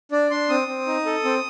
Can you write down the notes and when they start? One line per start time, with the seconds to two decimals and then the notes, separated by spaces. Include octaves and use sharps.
0.12 D4 D5
0.31 D4 C6
0.49 C4 D#6
0.68 C4
0.87 D#4
1.06 A4
1.25 C4